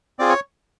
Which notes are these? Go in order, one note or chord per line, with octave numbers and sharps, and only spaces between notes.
C4 F4 G#4 D5
C#5